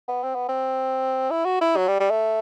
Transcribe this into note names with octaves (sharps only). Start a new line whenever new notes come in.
B3
C4
B3
C4
E4
F#4
E4
F#3
G3
G3
A3